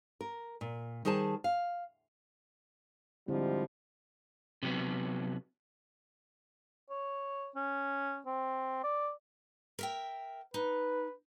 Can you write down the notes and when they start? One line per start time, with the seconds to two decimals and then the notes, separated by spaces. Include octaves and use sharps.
0.21 A#4
0.61 A#2
1.05 D#3 G3 G#4 C5 A5
1.44 F5
3.28 G#2 D3 F3 G3 C4 E4
4.63 C3 F#3 B3
6.91 C#5
7.56 C#4
8.26 C4
8.84 D5
9.79 A#4 E5 G5
10.54 D#4 B4